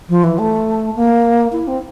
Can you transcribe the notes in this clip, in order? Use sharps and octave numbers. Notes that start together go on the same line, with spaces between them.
F3
E3
A3
A#3
E4
C4